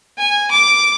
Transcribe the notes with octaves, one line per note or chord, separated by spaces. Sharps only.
G#5
D6